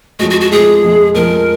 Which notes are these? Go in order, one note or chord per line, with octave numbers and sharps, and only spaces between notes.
F2 F3 G#3 F#4
F#4
F#4
F2 F3 G#3 G#4
F2 F3 G#3
F2 F3 G#3 A#4